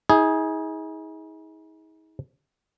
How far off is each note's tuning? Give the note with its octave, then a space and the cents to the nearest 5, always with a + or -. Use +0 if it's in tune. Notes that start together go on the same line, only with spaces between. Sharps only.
D#4 +45 G#4 +0